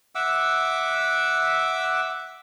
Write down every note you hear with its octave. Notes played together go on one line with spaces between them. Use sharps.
E5 F#5 D6 E6